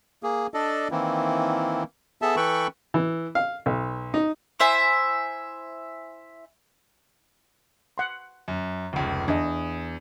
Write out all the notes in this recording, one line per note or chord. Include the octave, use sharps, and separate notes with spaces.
A#3 G#4
D4 A4 D5 D#5
D#3 E3 A#3 C4 E4
B3 G#4 A4 E5 A5
E3 A4 B4 G5 B5 C#6
E3
F5
B1
D#4
E4 C5 E5 G#5
F#5 C6
F#2
F1 C#2
E2 D4 D#5